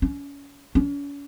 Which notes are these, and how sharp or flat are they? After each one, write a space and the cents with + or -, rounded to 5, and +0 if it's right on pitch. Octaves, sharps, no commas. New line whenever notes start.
C#4 +25
C#4 +40